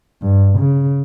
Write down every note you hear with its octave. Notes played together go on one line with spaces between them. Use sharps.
G2
C#3